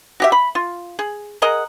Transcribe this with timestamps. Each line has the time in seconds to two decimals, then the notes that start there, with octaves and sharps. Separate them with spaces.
0.20 F#4 G4 E5
0.32 B5
0.55 F4
0.99 G#4
1.42 G#4 A#4 D#5 F#5